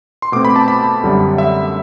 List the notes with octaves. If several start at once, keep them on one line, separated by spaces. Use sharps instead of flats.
C6
B2 A3 C4 D6
B5
A5
B5
F#2 D3 G3
E5